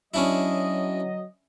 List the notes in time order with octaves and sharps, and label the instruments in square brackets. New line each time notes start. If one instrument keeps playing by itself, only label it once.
[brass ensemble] F#3 D#5 [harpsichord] C#4 D4 E4